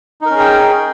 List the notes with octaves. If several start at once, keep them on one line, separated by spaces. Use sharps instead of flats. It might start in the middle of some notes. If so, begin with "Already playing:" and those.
C#4 D#4 G#4 A#4 G5